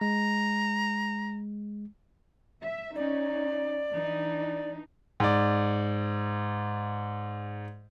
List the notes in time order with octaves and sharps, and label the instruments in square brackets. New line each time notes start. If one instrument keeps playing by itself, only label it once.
[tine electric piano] G#3 [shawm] A#5
[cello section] E5
[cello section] C#4 D#4 [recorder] D5
[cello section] E3 D4 D#4
[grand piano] G#2 D5